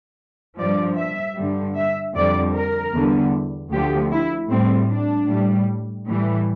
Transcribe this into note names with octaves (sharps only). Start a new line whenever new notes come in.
G2 F3 D5
E5
G2 D3 G3
E5
F2 D3 G3 D5
A#4
E2 D3 G3
D2 D3 F3 G4
E4
A2 G3 C4
D4
A2 G3
A2 E3 G3